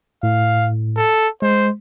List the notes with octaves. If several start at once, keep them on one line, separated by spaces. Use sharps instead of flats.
A2 F5
A4
G#3 C5